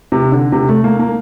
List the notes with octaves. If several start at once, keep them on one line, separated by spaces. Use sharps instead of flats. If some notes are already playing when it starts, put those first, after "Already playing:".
C3
D3
C3
A3
A#3
A#3